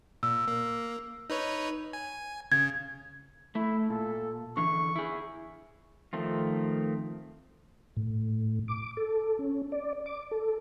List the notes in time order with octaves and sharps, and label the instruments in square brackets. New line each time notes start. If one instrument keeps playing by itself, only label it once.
[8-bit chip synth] A#2 [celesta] E6
[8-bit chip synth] A#3
D#4 B4 C#5
G#5
[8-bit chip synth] C#3 [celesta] G#6
[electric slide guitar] A3 [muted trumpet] E4
[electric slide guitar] A#2 [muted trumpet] A4
[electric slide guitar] D3 E3 [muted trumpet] C#6
[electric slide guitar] E4 G#4
[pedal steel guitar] D#3 F3 A3 C4 F4
[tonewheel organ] A2
D6
A4
C#4
D5
D6
A4